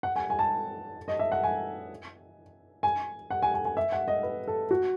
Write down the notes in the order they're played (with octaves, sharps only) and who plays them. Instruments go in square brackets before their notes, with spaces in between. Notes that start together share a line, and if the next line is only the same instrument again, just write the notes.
[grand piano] F#5
G#5
G#5
A5
D#5
E5
F#5
G#5
G#5
F#5
G#5
G#5
G#5
E5
F#5
D#5
B4
A4
F#4